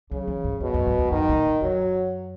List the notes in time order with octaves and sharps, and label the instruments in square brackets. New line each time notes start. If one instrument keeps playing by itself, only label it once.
[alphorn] C#3 [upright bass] F#3
[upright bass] E3
G#2
[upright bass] F#2 [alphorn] B2
[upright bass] F#2
G#2
E2
[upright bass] F#2 [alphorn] D#3
[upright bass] A#2
E2
[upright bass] F#2 [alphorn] F#3